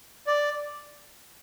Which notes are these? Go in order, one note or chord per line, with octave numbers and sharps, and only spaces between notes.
D5